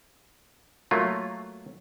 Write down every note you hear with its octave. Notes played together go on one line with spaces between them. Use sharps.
F#3 A3 A#3 F4